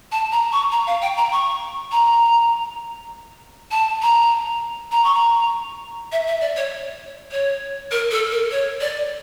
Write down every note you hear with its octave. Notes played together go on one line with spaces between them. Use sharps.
A5
A#5
C#6
A#5
F5
G5
A#5
C#6
A#5
A5
A#5
A#5
C#6
A#5
E5
E5
D5
C#5
C#5
A#4
A4
A#4
C#5
D5